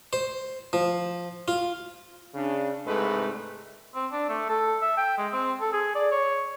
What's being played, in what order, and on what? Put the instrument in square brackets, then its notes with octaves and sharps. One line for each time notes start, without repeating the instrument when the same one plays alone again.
[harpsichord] C5
F3
F4
[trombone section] C#3 D4
C2 G#2 G#3 A3 B4
[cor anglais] C4
D4
A3
A4
E5
G5
G#3
C4
A4
G#4
D5
C#5